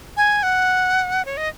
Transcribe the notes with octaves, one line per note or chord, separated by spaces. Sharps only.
G#5
F#5
C#5
D#5